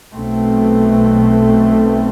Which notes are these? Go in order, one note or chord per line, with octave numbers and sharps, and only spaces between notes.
B1 B2 A3 C4